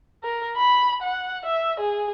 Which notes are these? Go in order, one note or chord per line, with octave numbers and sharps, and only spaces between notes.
A#4
B5
F#5
E5
G#4